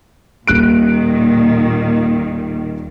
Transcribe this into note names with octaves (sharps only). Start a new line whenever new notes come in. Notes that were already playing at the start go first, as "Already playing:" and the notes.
D#1 A#2 D#3 F#6 D7